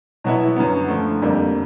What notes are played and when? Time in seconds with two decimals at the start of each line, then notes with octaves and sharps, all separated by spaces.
0.24 B2 F#3 B3 E4
0.56 F#2 D3 F#3 B3
0.88 D3 F3 A3
1.22 F2 D3 G3 A#3